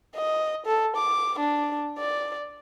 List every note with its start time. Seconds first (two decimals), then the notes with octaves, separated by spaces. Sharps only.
0.15 D#5
0.66 A4
0.96 D6
1.39 D4
1.98 D5